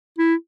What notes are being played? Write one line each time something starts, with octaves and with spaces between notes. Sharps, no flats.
E4